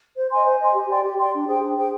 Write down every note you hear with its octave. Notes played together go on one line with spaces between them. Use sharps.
C5
D#5 G#5 C6
C5
D#5 G#5 C6
G4
D5 G5 C6
G4
D5 G5 C6
D4
G#4 C5 G5
D4
G#4 C5 G5